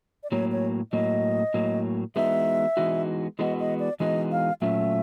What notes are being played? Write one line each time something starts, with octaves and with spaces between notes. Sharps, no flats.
D5
A2 F#3 A#3 C#5
C#5
A2 F#3 A#3 D#5
A2 F#3 A#3
E3 G#3 B3 D#4 F#4 E5
E3 G#3 B3 D#4 F#4
E3 G#3 B3 D#4 F#4 D#5
D#5
D5
E3 G#3 B3 D#4 F#4 D#5
F5
A#2 F#3 A3 C#4 F4 E5